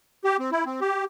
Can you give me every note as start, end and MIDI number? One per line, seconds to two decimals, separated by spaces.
0.24 0.37 67
0.39 0.50 60
0.52 0.64 64
0.66 0.80 60
0.81 1.05 67